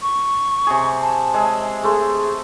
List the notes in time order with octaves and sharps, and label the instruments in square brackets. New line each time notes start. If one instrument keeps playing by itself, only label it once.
[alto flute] C#6
[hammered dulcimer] C3 G#4
[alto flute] A5
[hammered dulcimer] G#3 G#4 E5
[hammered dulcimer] A3 C6 [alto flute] G#4